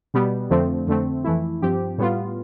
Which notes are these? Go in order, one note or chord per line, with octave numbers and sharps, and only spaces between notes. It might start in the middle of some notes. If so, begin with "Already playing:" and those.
B2 G3 B3
F2 D3 F3 A3 C4
F2 D3 A3 C4
F2 E3 A3 E4
G2 F3 C4 G4
A2 G3 B3 F4